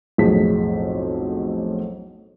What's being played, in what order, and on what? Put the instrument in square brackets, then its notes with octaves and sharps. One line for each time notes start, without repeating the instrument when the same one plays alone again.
[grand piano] B1 F2 A2 G#4 B6